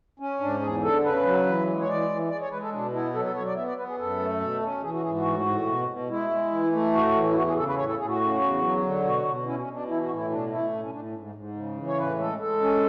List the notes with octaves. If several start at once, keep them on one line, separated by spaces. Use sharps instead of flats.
C#4
G#2 D4
E2 G#4
D3 A4
C#3 B4
F#3
E3
G#3
C#5
E3 D5
E3
G#3 D5
C#5
G#3 B4
A4
B2 D4
B3 E4
F#3 A4
A4
F#3 C#5
D5
B3 E5
D5
B3 B4
G#4
F#2 A4
A3
B2
C#4
E3 G#4
F#4
G#2 G#4
F#4
A2
A2
B2
B2
G#3 E4
G#3
E3
A3
A2 F#4
E3
E4
E2 F#4
G#4
C#3 A4
B4
A2 C#5
A4
A2 G#4
F#4
C#3
E2
F#3
D3
B2 F#4
B2
C#4 E4
C#4
B2
D4
E3 E4
F#4
A2
E4
B2 D4
A3 E4
A2 C#4
C#4
A2 D4
G#2
G#2
C#3
E3
C#5
A2 B4
G#3 A4
G#3 A4
C#4